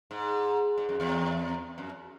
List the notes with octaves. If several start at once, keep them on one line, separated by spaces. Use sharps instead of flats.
G#2
G#2
F#2
E2
F#2